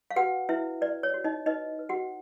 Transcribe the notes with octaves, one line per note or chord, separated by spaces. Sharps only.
F5
F#4 B4 F#5
E4 B4 E5
B4 D5
C#5
F#4
D#4 D#5
D#4 B4 D#5
B4
F#4 F#5